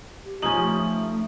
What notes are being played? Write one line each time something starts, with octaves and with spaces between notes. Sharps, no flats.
G4
F3 C#4 D#4 D#6 F#7
A3